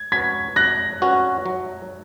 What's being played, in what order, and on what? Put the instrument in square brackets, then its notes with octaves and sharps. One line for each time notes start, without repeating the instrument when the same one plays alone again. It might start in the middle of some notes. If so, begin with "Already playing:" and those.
Already playing: [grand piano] G#6
[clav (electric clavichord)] C#4 F#4 B4 [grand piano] G#6 B6
[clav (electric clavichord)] F#3 [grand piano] F#6 A#6
[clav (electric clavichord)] C#4 F#4 B4
F#3